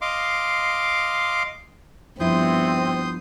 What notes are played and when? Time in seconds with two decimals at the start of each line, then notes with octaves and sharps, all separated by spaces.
0.01 D#5 F5 C6 D6
2.20 G2 F3 B3 C4 E4 C6 D#6 G6